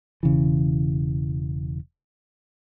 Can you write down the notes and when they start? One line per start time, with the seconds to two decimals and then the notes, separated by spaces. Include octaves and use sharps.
0.23 E1 C#3 E3